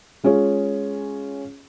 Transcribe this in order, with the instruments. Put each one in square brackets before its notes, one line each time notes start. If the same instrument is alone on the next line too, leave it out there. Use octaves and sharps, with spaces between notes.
[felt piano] G#3 C#4 F4 G#4 C#5